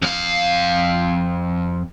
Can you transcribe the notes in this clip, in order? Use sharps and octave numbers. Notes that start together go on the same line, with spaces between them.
F2 F5